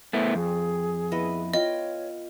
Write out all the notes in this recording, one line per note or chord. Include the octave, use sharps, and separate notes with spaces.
A3 B3 E4 C5
F2 G#4
B3 E4 D#5
F4 C#5 D#5 G5